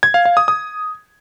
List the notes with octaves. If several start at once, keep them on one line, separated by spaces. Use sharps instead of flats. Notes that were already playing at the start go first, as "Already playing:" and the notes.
G#6
F5
F5
D#6
D#6